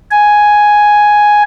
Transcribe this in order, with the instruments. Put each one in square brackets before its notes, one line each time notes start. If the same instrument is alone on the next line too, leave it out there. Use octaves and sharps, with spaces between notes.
[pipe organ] G#5